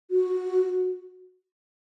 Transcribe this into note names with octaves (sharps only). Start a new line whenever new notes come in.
F#4